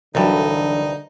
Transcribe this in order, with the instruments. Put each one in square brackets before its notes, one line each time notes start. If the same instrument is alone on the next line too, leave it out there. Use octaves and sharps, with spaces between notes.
[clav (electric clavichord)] C2 G2 [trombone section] D3 [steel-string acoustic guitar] E3 F#3 D4 [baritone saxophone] D#4